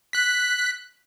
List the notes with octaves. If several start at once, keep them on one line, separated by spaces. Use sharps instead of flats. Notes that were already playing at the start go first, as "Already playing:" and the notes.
F#6 B6